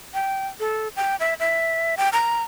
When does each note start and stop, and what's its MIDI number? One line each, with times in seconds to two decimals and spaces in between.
0.14 0.48 79
0.60 0.88 69
0.96 1.16 79
1.20 1.34 76
1.40 1.95 76
1.97 2.09 79
2.13 2.43 82